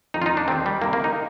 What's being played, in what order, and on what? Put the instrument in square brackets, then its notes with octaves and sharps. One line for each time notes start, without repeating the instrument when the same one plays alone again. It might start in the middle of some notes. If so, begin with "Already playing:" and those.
[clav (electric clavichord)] F2 D#3 D#4
F4
D#4
D4
D#2 D#3 C4
G3
C2 C3 D#3 A#3
A#3
D#4